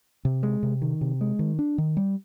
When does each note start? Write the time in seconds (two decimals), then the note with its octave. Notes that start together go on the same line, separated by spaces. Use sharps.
0.25 C3
0.43 G#3
0.63 C3
0.82 D#3
1.01 C3
1.21 G#3
1.39 D#3
1.59 D4
1.78 D#3
1.97 G3